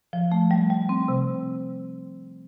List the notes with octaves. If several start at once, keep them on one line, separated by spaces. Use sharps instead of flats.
F3
A3
G3
G3
C4
C3